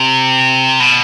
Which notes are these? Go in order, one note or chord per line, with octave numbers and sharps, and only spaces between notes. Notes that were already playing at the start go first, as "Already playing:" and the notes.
Already playing: C3
B2